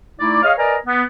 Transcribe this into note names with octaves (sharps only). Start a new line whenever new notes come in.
A3 D#4 E4 D5
G#4 C#5 D#5 F5
A#4 B4 D5 D#5 G#5 A#5
B3